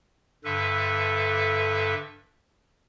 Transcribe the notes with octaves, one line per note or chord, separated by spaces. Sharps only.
G2 D3 A4 B4 E5